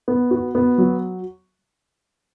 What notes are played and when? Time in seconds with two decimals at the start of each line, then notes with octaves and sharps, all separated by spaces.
0.08 B3
0.31 F#4
0.55 B3
0.78 F#3